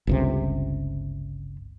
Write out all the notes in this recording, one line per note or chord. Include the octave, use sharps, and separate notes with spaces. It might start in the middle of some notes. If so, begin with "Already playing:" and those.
G1 C#2 C3